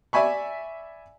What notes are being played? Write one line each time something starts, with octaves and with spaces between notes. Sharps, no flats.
D5 E5 G#5 B5 C#6